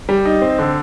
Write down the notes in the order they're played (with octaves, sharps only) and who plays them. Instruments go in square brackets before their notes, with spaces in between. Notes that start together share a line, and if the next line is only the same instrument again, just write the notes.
[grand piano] G3
D#4
C4
D3